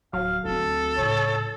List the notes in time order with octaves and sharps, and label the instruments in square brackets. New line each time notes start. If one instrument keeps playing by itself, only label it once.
[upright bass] D1 [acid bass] F#3 [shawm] F5
[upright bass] D2 C4 [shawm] A4
[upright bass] A2 C#3 [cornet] C#5